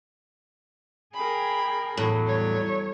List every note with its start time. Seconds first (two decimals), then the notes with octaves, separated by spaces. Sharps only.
1.15 G#4 A#4 G5 B5
1.97 E2 A2 F#3
2.27 G3 C#5